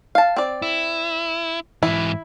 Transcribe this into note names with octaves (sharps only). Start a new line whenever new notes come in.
F5 A5
C4 D5
E4
G#2 E3 E4